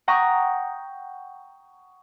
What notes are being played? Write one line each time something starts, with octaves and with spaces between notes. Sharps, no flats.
F#5 G5 A#5 C#6 D#6